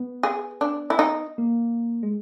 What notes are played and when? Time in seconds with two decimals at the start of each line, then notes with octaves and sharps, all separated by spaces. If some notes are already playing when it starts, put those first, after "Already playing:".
Already playing: B3
0.23 G#4
0.61 D4
0.90 E4
0.99 D#4
1.38 A#3
2.03 G#3